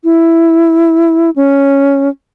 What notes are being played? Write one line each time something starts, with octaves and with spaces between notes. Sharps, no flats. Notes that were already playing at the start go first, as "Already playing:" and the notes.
E4
C#4